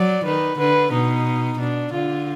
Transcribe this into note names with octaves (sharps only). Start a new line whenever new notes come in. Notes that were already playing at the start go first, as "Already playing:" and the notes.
Already playing: F#3 D5
D#3 B4
D3 B4
B2 D#4
B2 D4
D3 F4